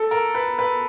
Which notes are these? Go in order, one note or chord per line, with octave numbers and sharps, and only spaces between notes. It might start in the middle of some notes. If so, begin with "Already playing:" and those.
Already playing: A4
A#4
B4
B4